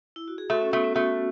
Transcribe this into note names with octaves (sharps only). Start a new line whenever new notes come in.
E4
F#4
G#4
A3 F#4 A4
C#4
A3 B3
C#4
A3 F#4 A4